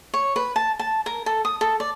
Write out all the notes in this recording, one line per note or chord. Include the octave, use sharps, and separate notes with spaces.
C#5
B4
A5
A5
A#4
A4
D#6
A4
D5